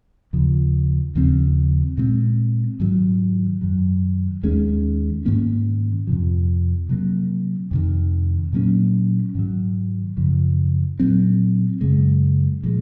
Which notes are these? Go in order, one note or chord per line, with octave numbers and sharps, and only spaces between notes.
D#2 C#3 F3
D#2 C#3 F3 C4
A#2 G#3 C4
G#2 D#3 F#3
F#2 D#3 F#3
D#2 D#3 G#3 C#4
G#2 D#3 A#3 C#4
F2 C3 F3
C3 F#3 A#3
F2 C3 D#3
A#2 F#3 A#3 C#4
G#2 D#3 F#3
F#2 C#3 F3
A#2 F#3 C4
F#2 C#3 G#3
A#2 F3 G#3